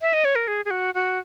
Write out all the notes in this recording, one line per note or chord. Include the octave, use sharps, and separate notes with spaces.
E5
D#5
C#5
A#4
G#4
G#4
F#4
F#4